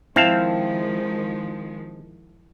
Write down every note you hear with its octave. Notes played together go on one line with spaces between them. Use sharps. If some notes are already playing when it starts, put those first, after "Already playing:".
D#3 F3 G#3 C4 E4 F5 A5